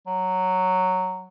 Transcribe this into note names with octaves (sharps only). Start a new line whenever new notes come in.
F#3